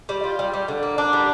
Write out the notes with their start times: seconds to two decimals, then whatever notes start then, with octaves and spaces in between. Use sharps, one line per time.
0.09 G3
0.24 F4
0.39 G3
0.54 G3
0.68 D3
0.83 A#3
0.98 D4
1.13 G3